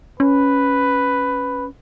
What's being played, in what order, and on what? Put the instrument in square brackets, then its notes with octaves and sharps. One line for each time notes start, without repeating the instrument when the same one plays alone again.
[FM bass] C#4 [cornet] B4